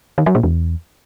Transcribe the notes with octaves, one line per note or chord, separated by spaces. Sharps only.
D#3
F#3
A#2
E2